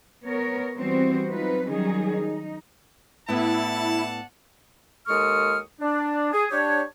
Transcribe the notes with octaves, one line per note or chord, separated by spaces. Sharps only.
B3 A#4 C#5
E3 G3 B3 C4 F#4 C5
F#3 C4 D#4 F4 B4
D#3 F#3 G3 C#4 D#4 G#4
D#4
A2 B3 D4 E4 F#5 A5
D#2 G#3 A4 C#6 D#6 F6
D4
G#4
D4 G4 C#5